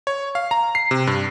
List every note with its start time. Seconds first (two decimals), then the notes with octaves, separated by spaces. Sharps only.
0.07 C#5
0.35 F5
0.51 A#5
0.75 C7
0.91 C3
1.07 G2